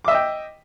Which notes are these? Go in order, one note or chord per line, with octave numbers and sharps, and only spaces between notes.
D#5 E5 G5 D6